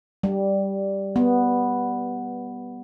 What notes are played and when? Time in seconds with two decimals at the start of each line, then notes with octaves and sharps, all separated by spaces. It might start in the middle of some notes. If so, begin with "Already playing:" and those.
0.23 G3
1.16 B3